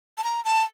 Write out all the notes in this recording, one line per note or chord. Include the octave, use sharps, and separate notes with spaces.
A5
A#5
A5